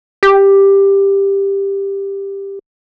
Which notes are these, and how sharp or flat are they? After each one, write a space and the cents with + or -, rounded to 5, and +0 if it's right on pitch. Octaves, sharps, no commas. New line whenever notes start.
G4 +10